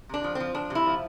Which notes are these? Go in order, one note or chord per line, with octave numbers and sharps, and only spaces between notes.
C3 D4
F3
C4
F3
F3 D4
C3
E4
F3